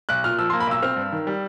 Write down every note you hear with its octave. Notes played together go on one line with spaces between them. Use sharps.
B1 F#6
A#2 F6
F3 E6
C6
A#3
B5
B1 E6
C4 F6
G2
D#3
G3